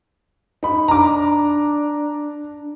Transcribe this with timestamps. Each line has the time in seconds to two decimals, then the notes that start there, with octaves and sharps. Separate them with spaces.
0.63 D#4 B5
0.88 D4 A#5 D6